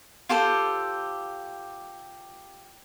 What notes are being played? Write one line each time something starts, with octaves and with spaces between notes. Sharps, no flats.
F4 G4 A4 C5